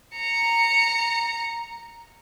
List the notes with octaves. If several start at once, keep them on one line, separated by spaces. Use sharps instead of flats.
A#5 C#7